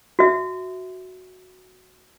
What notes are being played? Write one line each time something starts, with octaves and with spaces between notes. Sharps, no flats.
F#4 E5